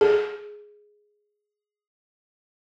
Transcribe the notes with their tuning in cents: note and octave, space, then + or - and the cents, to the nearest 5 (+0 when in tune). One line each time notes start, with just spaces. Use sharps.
G#4 +5